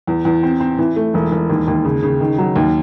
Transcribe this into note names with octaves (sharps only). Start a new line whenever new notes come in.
E2
E2
C4
C4
E3
A3
E1
E1
D#2
D#2
C#3
C#3
D#3
F#3
D#2